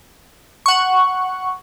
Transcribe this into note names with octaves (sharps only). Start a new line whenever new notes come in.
F#5 C#6